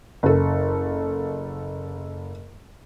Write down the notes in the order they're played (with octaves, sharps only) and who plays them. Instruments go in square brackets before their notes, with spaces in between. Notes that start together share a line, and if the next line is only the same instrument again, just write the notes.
[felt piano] F#1 A4